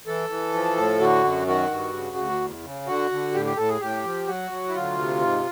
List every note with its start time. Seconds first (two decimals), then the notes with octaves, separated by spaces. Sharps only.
0.07 E3 A4
0.30 E3
0.53 F3
0.77 A2
1.00 D3 F#4
1.24 F#2
1.47 D#3 F#4
1.71 G2
1.93 C#3
2.17 D2
2.41 E2
2.63 C#3
2.87 D3 F#4
3.11 D3
3.34 A2 G4
3.46 G4
3.57 A2 A4
3.69 G#4
3.81 A2 G4
4.04 F3
4.27 F#3 F#4
4.51 F#3
4.68 E4
4.75 D2 F4
4.98 C3
5.22 G#2